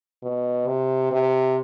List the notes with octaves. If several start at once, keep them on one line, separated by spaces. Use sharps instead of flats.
B2
C3
C3